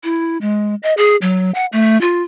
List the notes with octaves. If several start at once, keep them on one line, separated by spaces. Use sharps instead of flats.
E4
G#3
D#5
G#4
F#3
F#5
A3
F4